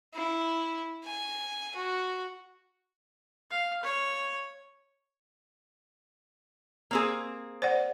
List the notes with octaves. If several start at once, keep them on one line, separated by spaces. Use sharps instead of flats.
E4
G#5
F#4
F5
C#5
A#3 C4 G#4
C5 D5 F#5